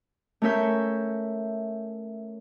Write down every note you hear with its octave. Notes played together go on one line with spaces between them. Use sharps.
A3 C#4 A#4 C#5 E5 G6